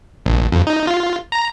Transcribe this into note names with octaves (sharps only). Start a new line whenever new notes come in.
A#1
F2
D#4
F4
A#5